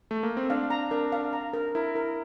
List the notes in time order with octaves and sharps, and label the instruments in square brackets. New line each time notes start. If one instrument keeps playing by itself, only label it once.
[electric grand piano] A3
A#3
C4
[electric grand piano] D4 [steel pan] F5
[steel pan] A#5
[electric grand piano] D4 [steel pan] A#4
[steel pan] F5
A#5
A#4
[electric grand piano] E4 [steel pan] A#4
[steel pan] A#4